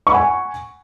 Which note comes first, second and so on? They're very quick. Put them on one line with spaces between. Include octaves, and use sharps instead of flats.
C#6 B5 F#5 G#5